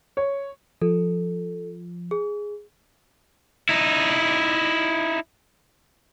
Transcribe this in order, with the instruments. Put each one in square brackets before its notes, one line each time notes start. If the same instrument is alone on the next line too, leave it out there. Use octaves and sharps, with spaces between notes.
[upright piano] C#5
[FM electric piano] F3 [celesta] A4
[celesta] G#4
[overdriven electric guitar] D#4 E4